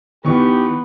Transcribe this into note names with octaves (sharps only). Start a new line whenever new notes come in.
E2 B3 D#4 G4 C#6